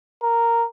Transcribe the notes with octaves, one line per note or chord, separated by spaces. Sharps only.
A#4